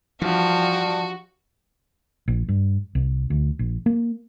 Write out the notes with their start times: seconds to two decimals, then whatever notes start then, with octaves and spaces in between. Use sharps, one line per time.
0.22 G2 E3 F3 F#4
2.28 A#1
2.49 G2
2.95 C2
3.30 D2
3.59 A#1
3.86 A#3